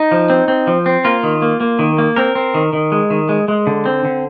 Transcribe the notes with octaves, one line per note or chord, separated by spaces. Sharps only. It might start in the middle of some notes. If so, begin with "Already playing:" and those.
Already playing: D#4
F3
C4
C4
F3
C4
A#3 F4
D#3
A#3
A#3
D#3
A#3
C4 A#4
C4
D#3
D#3
G#3
D#3
G#3
G#3
D3
C4
D3